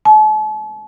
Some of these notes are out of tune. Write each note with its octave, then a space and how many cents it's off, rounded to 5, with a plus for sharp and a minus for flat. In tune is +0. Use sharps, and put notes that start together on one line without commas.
A5 -45